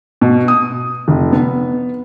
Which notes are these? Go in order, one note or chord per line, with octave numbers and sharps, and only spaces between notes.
B2
D#6
F1
B3